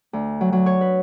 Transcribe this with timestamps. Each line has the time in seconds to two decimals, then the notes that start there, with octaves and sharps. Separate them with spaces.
0.13 D2
0.41 F#3
0.53 F#3
0.66 C#5
0.81 B4